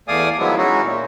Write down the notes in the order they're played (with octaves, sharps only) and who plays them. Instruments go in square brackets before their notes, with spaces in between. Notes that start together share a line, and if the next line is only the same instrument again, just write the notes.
[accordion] E2 A3 D5 F5 G#5 D#6
D#3 F3 F#3 G#3 B3 E4
G#3 C#4 D#4 E4 F#4
A#2